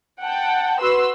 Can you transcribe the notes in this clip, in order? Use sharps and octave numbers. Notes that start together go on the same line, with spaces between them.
F#5 G5 A5
F#4 B4 C6 E6